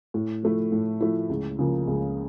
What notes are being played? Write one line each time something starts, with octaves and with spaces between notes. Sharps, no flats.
A2
F3 A3 E4
A2
F3 A3 E4
C#2
C#3 F3 A#3
C#2